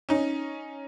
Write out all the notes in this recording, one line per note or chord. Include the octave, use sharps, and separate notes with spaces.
C#4 D#4